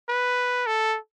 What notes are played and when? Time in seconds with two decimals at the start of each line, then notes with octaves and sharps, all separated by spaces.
0.09 B4
0.67 A4